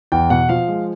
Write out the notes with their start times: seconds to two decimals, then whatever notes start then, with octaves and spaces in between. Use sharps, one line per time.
0.12 E2 G5
0.30 B2 F#5
0.49 F3 F5
0.68 G#3